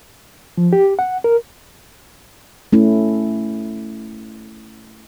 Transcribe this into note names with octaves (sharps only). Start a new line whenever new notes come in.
F3
G4
F#5
A#4
A3 C#4 E4